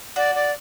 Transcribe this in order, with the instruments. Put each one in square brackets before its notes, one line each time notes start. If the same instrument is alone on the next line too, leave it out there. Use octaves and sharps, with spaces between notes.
[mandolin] F#4 [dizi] D5
[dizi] D5